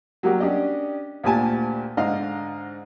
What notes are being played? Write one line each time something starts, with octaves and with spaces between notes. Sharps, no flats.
F#3 G3 A#3 F#4 G4
C#4 D4 G4 D#5
D2 A#2 G4 G#5 A5
G#2 D3 D#5 F5